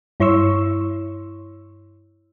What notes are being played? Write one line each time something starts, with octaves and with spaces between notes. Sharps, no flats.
G2 E4 C#5 C6 C#6 E6